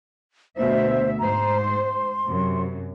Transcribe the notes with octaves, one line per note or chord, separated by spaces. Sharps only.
D2 B2 C5 E5
G#2 C5 A#5
C6
F#2 C3